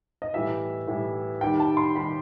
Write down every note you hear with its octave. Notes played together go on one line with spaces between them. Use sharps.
D#5
A2 E3 G3 E5
A2 E3 G3
D#2 D#3 G3 G5
A5
C6
D#2 D#3 G3 B5